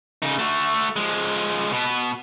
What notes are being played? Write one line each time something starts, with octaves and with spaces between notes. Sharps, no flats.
C#3 D#4
A3 F#4
F3 G#3
B2 B3